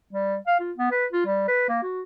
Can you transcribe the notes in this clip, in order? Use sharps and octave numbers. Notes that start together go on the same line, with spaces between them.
G3
F5
F4
B3
B4
F4
G3
B4
A#3
F#4